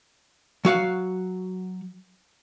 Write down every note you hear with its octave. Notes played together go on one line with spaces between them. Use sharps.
F#3 F#4 F5 F#5